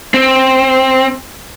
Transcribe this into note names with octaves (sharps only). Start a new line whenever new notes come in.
C4